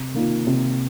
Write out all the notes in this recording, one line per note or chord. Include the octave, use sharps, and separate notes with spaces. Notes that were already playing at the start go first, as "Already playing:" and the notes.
Already playing: C3
D#3 A#3 F4
C3